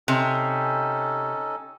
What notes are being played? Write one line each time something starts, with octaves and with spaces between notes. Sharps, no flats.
C3 C#4 D#4 A4